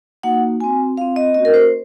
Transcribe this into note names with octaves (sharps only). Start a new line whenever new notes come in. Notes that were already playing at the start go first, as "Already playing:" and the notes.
A#3 D#4 F#4 F#5
C4 F#4 G#5
C4 F4 F5
D#5
A#3 C#4 F#4 D#5
A#4
C5